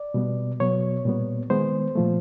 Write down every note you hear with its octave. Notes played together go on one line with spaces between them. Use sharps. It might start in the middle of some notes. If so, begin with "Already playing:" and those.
Already playing: D5
B2 G3 B3
B2 F#3 B3 C#5
A#2 G3 B3
D#3 G#3 B3 C5
A#2 F3 A3